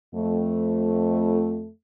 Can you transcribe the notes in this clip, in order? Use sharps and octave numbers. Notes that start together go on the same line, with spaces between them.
F2 A3